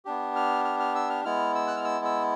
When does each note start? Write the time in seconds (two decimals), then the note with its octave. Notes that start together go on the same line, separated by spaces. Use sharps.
0.05 B3 D4 G4
0.36 F6
0.65 F6
0.80 F6
0.95 E6
1.10 F6
1.25 G#3 B3 E4 F6
1.55 E6
1.68 F#6
1.77 F6
1.84 E6
2.05 E6